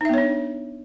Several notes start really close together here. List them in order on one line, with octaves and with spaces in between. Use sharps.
D#4 E5 B3 C#5 D4